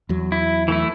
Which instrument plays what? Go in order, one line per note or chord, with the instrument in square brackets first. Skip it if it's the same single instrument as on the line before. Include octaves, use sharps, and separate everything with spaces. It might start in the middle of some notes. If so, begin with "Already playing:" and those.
[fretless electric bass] E2 F#3
[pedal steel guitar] E4
E3 A3 E4